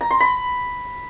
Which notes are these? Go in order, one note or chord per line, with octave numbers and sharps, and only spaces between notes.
A#5
C6
B5